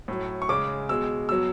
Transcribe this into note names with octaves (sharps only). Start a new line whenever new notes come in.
A2 F#3
C#6
C#3 G#3 D6
B2 G#3 E6
B2 F#3 E6